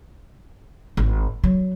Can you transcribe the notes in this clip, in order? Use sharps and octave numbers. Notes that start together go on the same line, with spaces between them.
G#1
F#3